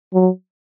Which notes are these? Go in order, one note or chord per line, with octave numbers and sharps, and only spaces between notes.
F#3